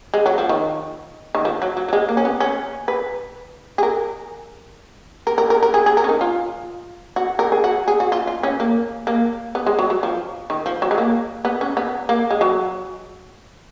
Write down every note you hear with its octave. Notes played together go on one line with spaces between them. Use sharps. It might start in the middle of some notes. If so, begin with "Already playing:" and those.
G#3
F#3
F3
D#3
D#3
F3
F#3
F#3
F#3
G#3
A#3
C#4
B3
C#4
B4
G#4
A#4
A#4
A#4
A#4
A#4
G#4
G#4
A#4
C#4
D#4
F4
F#4
A#4
G#4
F#4
G#4
F#4
F4
F4
C#4
A#3
A#3
B3
G#3
F#3
F#3
F3
D#3
F3
F#3
G#3
A#3
B3
C#4
B3
A#3
G#3
F#3